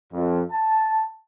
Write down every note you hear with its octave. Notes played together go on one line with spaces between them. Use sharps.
F2
A5